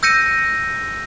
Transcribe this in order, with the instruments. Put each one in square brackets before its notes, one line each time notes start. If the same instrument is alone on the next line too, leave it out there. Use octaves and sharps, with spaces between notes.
[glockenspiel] E6 G6 A#6 C#7 D#7